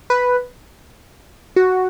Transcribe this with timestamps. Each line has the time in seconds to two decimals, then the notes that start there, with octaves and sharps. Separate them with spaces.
0.10 B4
1.56 F#4